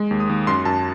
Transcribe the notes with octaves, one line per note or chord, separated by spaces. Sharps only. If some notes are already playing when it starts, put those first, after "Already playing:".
Already playing: G#3
D#2
D#6
D#2
F#2 C6
F#2 A5